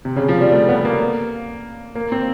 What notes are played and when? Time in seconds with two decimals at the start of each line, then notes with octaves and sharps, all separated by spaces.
0.05 C3
0.16 C#3
0.28 F3
0.41 G3
0.52 A3
0.69 B3
0.85 A#3
1.95 A#3
2.12 C4